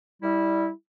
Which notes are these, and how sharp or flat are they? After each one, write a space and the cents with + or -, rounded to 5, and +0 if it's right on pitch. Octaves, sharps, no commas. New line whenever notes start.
G3 +0 E4 -15